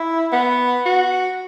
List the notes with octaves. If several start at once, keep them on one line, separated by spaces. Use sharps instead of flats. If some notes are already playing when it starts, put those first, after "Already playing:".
Already playing: E4
B3
F#4